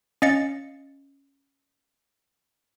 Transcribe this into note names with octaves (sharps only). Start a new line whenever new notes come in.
C#4 D#5 F5 A6 C#7